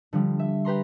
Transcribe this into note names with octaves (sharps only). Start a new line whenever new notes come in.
D3 F3 G3
E5
G4 B4 A#5 C6